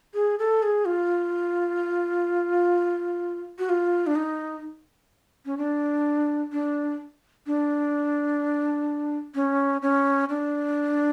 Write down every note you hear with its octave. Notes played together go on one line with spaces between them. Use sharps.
G#4
A4
G#4
F4
F#4
F4
D4
D#4
C#4
D4
D4
D4
C#4
C#4
D4